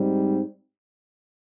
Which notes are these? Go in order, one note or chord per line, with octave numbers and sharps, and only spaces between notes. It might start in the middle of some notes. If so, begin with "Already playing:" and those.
Already playing: G#2 G3 C4 D#4